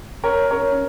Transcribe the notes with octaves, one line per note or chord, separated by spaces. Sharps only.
A#4 C#5
A#4 C#5